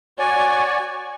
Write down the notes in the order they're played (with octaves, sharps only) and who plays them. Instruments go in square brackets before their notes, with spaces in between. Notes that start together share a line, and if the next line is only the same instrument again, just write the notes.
[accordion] F#4 C#5 D5 [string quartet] G#5